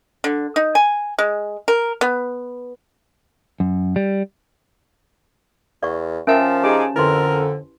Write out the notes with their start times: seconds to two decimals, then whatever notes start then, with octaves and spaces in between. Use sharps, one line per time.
0.24 D3
0.56 D#4
0.75 G#5
1.19 G#3
1.68 A#4
2.01 B3
3.60 F#2
3.96 G3
5.83 E2 D5 F#5 C#6
6.27 F3 C#4 A#4 E5 G5 A5
6.63 D#4 G4 G#4 D6
6.96 F2 D3 E4 A#4 B4 C6